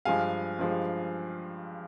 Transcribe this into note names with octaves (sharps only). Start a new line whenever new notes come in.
G2 F3 G#3 F5 G#5
G2 F3 G#3